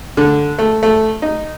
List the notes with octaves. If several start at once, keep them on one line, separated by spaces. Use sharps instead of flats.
D3
A3
A3
D#4